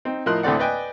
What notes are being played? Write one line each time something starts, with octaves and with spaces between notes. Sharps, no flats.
C4 D#4
A2 F3 A#4 D#5 C6 F#6
D2 A2 A3 C4 D5 F#5
B4 D5 D#5 G5 G#5